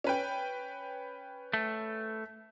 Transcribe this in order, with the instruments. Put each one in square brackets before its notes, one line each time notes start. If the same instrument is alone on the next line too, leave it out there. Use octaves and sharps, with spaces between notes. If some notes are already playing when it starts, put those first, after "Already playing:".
[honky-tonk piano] C#4 B4 G5
[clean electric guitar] A3